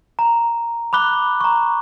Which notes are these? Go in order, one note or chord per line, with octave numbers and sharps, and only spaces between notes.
A#5
B5 D6 F#6 G7
A#5 C#6